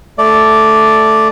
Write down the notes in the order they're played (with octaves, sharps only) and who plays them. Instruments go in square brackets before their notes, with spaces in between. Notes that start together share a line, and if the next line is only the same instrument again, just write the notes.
[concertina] A3 D5